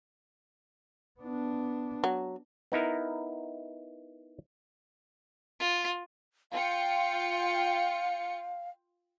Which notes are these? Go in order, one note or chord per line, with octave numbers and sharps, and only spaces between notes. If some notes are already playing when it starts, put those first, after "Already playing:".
B3 D4
F#3
B3 D#4 E4 A#4
F4
F4 F5 G5 C#7